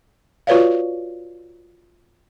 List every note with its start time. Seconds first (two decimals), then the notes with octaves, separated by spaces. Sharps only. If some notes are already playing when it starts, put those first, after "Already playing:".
0.47 F4 F#4 B4 C#5 D5 F5